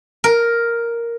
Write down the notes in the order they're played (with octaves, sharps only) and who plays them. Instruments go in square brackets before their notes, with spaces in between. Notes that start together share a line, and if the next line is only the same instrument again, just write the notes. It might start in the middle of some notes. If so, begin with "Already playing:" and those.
[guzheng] A#4